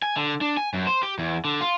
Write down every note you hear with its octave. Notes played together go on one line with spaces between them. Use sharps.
G#5
D3
D4
G#5
F#2
C5
G4
E2
D3
F4